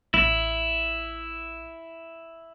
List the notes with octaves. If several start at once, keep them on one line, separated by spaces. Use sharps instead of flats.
A1 E4